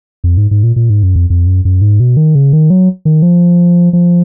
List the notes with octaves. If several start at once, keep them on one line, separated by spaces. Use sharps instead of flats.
F2
G#2
G#2
A#2
A#2
G#2
F#2
F2
F2
F#2
F#2
G#2
B2
D#3
C#3
D#3
F#3
D#3
F3
F3